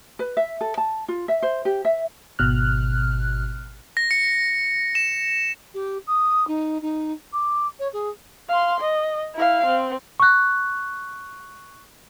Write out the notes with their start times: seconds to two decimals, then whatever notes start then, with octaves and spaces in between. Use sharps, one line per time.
0.19 B4
0.37 E5
0.61 A4
0.78 A5
1.08 F4
1.28 E5
1.42 C5
1.65 G4
1.85 E5
2.39 G#1 B2 F6 F#6
3.97 A#6
4.11 C#7
4.95 E7
5.74 G4
6.07 D#6
6.47 D#4
6.82 D#4
7.33 D6
7.79 C#5
7.93 G#4
8.49 F5 C6
8.80 D#5
9.35 E4 F5
9.66 C4
10.20 C#6 F#6